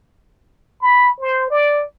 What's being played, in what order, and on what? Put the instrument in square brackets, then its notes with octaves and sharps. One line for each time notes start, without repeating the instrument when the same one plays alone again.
[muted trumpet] B5
C5
D5